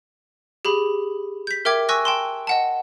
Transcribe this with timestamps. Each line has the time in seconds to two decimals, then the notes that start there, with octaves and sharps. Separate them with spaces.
0.65 G4 G#4 B5
1.47 G6 B6
1.65 A#4 E5 G5 D6 G#6
1.89 G#5 C#6 E6 F#6 A#6
2.05 G5 A5 C6
2.47 D#5 F#5 A5